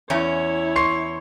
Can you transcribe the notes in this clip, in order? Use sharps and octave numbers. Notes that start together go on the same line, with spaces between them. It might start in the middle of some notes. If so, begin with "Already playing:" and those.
E2 C#4 E4 C#5
C6 C#6 C7